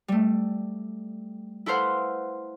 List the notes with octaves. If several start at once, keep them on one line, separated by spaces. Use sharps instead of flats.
G3 A3
E4 A4 B4 C5 F5 F#5